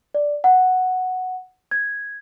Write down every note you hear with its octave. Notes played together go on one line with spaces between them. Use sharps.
D5
F#5
G#6